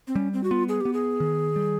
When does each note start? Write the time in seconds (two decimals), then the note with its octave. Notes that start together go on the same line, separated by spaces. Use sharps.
0.08 C4
0.15 G3 C#4
0.33 C4
0.44 F#4
0.51 B3 F4
0.69 G#4
0.81 B3 G4
0.93 G#4
1.20 D#3
1.56 G3